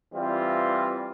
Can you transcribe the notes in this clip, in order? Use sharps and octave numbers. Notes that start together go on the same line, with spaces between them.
E3 G3 C4 F4